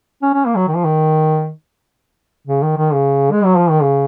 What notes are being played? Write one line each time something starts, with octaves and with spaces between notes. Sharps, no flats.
C#4
C#4
A#3
F#3
D#3
F3
D#3
C#3
D#3
D#3
C#3
G#3
F#3
F3
D#3
C#3